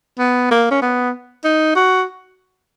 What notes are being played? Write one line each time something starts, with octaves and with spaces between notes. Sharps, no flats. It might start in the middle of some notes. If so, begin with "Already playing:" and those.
B3
A#3
C#4
B3
D#4
F#4